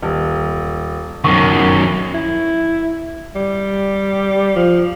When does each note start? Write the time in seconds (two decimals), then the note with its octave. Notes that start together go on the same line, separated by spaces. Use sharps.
0.02 D#1
1.24 F#2 D#3 C#6
2.14 E4
3.35 G3
4.56 F3